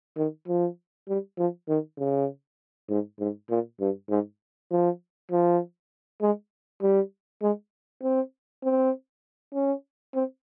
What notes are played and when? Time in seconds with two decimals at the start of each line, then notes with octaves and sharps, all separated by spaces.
0.17 D#3
0.48 F3
1.08 G3
1.38 F3
1.69 D#3
1.99 C#3
2.90 G#2
3.20 G#2
3.50 A#2
3.80 G2
4.10 G#2
4.71 F3
5.31 F3
6.22 G#3
6.82 G3
7.42 G#3
8.03 C4
8.64 C4
9.54 C#4
10.15 C4